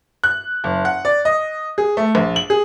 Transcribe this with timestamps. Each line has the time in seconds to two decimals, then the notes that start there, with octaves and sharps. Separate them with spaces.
0.24 F#6
0.64 F#1
0.85 F#5
1.05 D5
1.25 D#5
1.78 G#4
1.97 A3
2.15 A#1
2.36 F#7
2.50 G#4